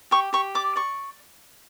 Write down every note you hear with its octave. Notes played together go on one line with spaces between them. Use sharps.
G4 C#6
G4 C#6
D5 D6
D5 C#6